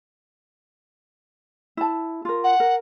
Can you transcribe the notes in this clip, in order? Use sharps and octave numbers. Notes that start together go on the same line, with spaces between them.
E4 A5
F4 A#4
F#5
A#4